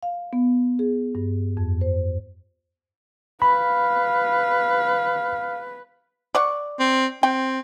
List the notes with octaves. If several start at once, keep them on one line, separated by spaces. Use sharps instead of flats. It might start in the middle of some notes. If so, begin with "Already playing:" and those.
F5
B3
G#4
G2
F2
C5
B4 F5 B5
D5 F#5 C#6
C4
C4 G5